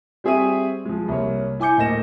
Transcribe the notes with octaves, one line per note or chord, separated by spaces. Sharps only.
G3 C4 G#4 E5 C#6 D#7
F3 G#3
C2 A#3 C#5
E4 G#5 D6 G6 C#7
D1 A3 A#3 D#5 A#6 E7